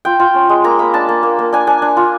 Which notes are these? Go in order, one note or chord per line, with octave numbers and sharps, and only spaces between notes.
F4 G5
F4
C#4
G#3
A#3 A#5
A#3 B5
D4 A5
A#3
A#3
A#3
D4 G#5
D4 G#5
D4
F4